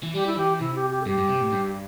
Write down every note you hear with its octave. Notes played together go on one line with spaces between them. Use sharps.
E3
G3 G4
E4
E3 G4
C3 E4
G4
G4
A4
G2 G4
G2
C3
A2
G2